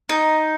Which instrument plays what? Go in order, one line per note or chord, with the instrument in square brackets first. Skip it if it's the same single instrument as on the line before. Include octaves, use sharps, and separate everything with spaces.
[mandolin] D#4